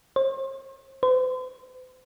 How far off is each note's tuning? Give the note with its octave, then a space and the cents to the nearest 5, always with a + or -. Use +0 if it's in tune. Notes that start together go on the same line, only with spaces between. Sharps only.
C5 +40
C5 -45